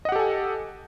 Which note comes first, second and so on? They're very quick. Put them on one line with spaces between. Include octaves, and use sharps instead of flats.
D#5 F#5 G4 A4 G#5